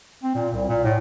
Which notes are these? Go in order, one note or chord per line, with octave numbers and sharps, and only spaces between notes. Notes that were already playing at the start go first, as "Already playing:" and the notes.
C4
A#2
C2
A#2
A2